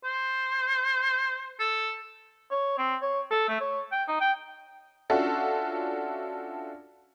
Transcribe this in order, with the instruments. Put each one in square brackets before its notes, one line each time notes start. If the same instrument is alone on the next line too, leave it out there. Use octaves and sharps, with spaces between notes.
[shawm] C5
A4
[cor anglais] C#5
C4
C#5
A4
A3
C#5
G5
D#4
G5
[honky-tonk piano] C#4 D4 F4 F#4 A4 E5